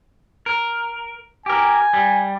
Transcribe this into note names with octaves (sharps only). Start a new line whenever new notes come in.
A#4
G4 A#4 G#5
G3